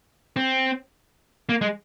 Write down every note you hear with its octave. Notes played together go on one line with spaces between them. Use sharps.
C4
A#3
G#3